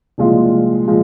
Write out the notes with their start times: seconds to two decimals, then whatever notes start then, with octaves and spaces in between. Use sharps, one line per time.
0.18 C2 A#2 F3 G#3 F4
0.88 A#2 F3 G#3